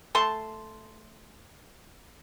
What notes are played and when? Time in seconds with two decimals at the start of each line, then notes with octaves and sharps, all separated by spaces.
0.15 A3 A5 C6